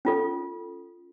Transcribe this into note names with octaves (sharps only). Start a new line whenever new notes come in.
C#4 F4 A4